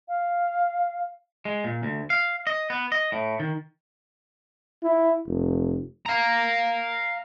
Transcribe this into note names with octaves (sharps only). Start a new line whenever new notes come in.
F5
G#3
A#2
D2
F5
D#5
B3
D#5
A2
D#3
E4
F1
F5 A#5